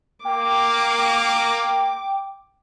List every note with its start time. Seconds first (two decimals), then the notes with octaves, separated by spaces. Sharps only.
0.25 A#3 G5 D6